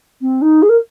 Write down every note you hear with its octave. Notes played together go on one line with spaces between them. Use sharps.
C4
D#4
G#4
A#4